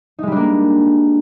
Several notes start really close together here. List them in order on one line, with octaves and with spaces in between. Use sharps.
D#4 G#3 G3 D4 A#3